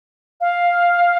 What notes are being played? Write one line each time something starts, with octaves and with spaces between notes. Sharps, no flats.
F5